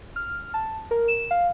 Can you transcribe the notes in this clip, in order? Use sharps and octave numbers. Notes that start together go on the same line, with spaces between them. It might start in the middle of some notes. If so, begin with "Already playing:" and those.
F6
A5
A#4
E7
F5